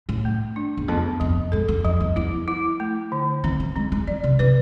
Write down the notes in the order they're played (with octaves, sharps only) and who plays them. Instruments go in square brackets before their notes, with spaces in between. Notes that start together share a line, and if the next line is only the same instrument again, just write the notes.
[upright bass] A2
[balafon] A3
D4
[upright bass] E2
[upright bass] F2 [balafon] B3
[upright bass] F2 [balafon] F3
[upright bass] G#2 [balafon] A4
[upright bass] F2
[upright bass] F2 [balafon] F3
[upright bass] E2
[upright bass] E2 [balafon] E4
[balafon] E4
A3
D3
[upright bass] E3 [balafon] C4
[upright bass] F3
[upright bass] G#3 [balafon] C4
[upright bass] G#3
[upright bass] F3 [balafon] D5
[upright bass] C3
[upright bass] C3 [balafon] B4